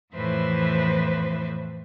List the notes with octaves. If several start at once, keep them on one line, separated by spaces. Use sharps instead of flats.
F2 A2 E3 B4 C5 E5